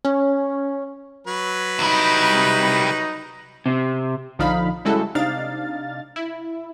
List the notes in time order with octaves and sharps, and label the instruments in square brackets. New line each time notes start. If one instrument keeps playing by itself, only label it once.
[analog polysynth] C#4
[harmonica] F#3 B4
[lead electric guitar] C2 G3 [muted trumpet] D#4
[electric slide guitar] C3
[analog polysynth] A#1 D3 F3 D#4 F5 B5
C#3 G3 G#3 E4 F#4 A4
C3 D4 D#4 F5 A6
E4